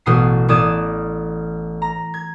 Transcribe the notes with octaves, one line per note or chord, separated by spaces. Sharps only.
A1 B2 D#6 C7
A1 D5 D#6 G#6 E7
A#5
G#6